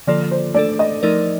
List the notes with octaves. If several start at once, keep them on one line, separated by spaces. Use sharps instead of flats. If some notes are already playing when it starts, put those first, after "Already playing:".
D3 F3 A#3 F4 A4 D5
C5
A3 D4 A4 D5
D#5
F3 A3 D#4 A#4 D5